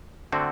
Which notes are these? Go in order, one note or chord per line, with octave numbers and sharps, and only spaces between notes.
D3 A3 C4 F#4